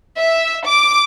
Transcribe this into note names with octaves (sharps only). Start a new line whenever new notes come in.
E5
D6